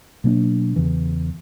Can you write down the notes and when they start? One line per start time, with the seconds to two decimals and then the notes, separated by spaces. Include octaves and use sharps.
0.24 B2 F#3 A#3 D4
0.76 E2 C#3 E3